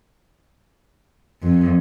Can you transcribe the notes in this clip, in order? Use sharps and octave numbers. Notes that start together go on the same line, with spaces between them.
F2